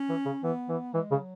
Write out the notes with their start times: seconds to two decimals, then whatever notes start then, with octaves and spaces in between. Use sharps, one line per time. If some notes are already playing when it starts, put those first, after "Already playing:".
Already playing: C#4
0.09 E3
0.26 C#3
0.43 E3 B3
0.69 E3
0.94 E3 G#3
1.11 C#3
1.19 F#3